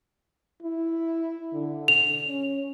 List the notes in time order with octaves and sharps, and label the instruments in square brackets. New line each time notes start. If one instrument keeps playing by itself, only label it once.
[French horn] E4
D3
[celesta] F7
[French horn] C#4